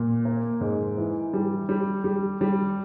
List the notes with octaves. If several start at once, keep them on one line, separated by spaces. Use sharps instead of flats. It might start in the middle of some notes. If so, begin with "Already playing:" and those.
Already playing: A#2
A#3
G#2
E3
G3
G3
G3
G3